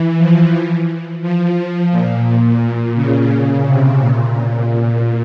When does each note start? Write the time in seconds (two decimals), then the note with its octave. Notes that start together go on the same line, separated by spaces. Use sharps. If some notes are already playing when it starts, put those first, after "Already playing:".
Already playing: E3
0.18 F3
1.22 F3
1.92 A#2
2.26 A#2
2.95 C#3
3.65 C3
4.00 A#2